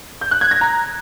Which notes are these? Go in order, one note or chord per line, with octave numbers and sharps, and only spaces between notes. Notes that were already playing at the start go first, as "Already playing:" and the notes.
G6
F#6
G#6
A#6
A#5